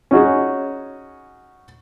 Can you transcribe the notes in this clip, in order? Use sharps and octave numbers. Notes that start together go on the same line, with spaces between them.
C#4 D#4 F#4 G#4